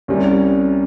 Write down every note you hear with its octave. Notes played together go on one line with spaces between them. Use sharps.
C2 C3 G3 C#4